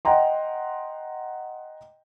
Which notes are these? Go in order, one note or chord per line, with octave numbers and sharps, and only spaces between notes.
D#5 F#5 G5 A#5 C6